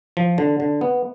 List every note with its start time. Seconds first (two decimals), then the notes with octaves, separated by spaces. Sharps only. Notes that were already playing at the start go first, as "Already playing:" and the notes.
0.17 F3
0.38 D3
0.60 D3
0.81 B3